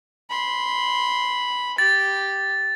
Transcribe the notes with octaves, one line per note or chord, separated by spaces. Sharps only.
B5 C6
G4 A6